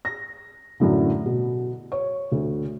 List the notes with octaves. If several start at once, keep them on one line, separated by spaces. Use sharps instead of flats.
A#6
F#2 A2 D3
B2
C#5
D2